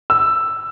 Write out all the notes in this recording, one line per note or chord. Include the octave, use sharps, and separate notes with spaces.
E6